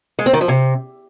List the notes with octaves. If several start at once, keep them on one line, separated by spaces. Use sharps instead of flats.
G#3
C4
D#3
F3
C3